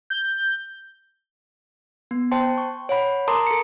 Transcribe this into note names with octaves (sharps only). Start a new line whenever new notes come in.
G6
B3
C5 G5 A5 C6
C#6
C#5 F#5 B5
A#4 A5 A#5 C6 D6 D#6
A4 C#7